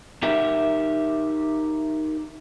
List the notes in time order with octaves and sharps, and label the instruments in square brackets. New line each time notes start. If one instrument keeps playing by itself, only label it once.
[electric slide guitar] D#4 G4 A#4 E5